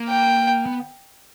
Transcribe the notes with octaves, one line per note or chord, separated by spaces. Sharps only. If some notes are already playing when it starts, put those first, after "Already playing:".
Already playing: A#3
G5
B3